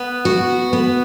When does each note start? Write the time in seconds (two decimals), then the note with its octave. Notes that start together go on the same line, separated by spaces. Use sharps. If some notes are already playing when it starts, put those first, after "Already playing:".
Already playing: B3
0.25 F#4
0.73 B3